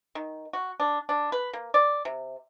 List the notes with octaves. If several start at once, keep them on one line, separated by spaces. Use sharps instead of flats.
D#3
F#4
D4
D4
B4
A#3
D5
C3